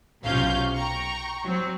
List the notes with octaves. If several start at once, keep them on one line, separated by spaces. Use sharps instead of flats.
B1 C3 C#4 F4 F5 G6
G5 A#5 C#6
F#3 C4